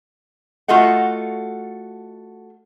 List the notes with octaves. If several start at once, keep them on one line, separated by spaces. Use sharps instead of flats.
A3 F4 F#4 A4 D#5 F#5